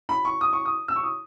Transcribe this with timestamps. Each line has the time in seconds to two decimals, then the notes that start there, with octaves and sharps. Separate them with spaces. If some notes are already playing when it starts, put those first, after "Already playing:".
0.09 B5
0.25 C#6
0.41 D#6
0.53 C#6
0.65 D#6
0.88 E6
0.96 C#6
1.03 D#6